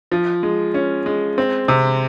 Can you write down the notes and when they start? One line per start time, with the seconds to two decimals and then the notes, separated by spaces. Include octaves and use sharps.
0.12 F3
0.43 G#3
0.74 C#4
1.06 G#3
1.38 C4
1.68 C3